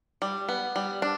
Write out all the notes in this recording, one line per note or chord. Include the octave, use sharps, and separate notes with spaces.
G3
B3
G3
D4